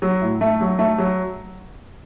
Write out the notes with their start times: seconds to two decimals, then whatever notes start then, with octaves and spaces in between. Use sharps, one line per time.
0.02 F#3
0.21 A2
0.41 A3
0.61 F#3
0.79 A3
0.98 F#3